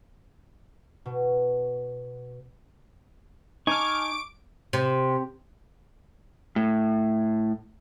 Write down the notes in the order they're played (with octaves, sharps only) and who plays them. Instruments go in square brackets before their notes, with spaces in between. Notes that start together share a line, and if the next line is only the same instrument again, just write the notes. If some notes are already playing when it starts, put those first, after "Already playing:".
[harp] B2
[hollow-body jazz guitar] D#4 [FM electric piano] G#5 A5 F6 [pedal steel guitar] C#6 [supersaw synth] D6 D7
[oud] C3
[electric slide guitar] A2